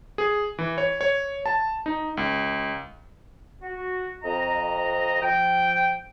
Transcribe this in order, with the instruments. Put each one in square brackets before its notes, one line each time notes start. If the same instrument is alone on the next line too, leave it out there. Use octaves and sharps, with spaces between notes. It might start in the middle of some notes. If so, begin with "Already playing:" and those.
[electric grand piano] G#4
E3
C#5
C#5
A5
D#4
C#2
[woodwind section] F#4
F2 D#5 A#5
F3 G5